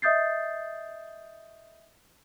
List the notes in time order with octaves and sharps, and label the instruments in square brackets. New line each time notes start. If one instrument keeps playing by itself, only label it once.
[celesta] D#5 E5 D#6 G6 A6 C7